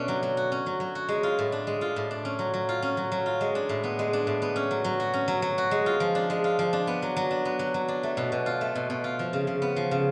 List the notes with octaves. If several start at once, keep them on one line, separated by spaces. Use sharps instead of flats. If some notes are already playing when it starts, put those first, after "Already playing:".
Already playing: B2 A3 C#4 D4
F#3
F#3
F#4
C#4
F#3
F#3
F#4
G#3
F4
A2
D4
G#3
F4
A2
D4
C#4
F#3
F#3
F4
C#4
F#3
F#3
F4
G#3
D4
A2
B3
G#3
D4
A2
B3
C#4
F#3
F#3
F#4
C#4
F#3
F#3
F#4
G#3
F4
F3
D4
G#3
F4
F3
D4
B3
F#3
F#3
D4
B3
F#3
F#3
D4
A3
B2
B2
F4
A3
B2
B2
F4
F3
C#3
C#3
B3
F3
C#3